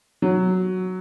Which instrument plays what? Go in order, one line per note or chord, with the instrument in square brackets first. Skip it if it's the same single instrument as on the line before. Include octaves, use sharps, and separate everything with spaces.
[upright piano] F#3